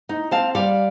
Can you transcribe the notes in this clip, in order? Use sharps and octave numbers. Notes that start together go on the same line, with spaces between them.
D#4
C4 F5 A5
G3 D5 F5